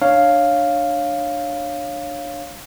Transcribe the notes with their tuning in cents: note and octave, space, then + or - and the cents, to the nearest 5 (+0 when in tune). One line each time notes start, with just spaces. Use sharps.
D4 +15 C#5 +0 F5 +0